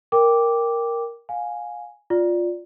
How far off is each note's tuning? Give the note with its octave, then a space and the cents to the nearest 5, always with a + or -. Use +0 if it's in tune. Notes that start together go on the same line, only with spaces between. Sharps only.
A#4 +0 G5 +10 D6 -5
F5 +25 G#5 +0
F4 +10 D5 +0